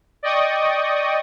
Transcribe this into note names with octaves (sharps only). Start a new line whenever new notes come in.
D5 D#5 G5 C#6 D#6